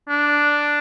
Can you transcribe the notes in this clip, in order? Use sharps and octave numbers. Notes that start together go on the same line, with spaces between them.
D4